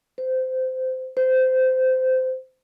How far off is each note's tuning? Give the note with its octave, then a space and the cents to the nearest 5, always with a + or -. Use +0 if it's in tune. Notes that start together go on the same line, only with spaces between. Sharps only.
C5 -20
C5 -20